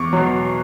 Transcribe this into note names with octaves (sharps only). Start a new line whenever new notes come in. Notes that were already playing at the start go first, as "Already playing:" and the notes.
Already playing: E2 C#6 D6
B2 F#3